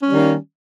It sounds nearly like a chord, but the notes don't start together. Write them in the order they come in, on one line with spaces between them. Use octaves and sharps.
C#4 G3 D#3 A#3